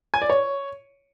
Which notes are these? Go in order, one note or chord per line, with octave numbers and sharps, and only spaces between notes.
G#5
D5
C#5